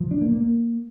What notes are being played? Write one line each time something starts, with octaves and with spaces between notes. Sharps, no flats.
F3
D4
A#3
A#3